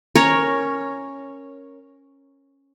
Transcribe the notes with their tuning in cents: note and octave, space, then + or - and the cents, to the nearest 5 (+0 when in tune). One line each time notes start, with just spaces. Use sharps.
C#4 -10 A#4 +0 C#5 +0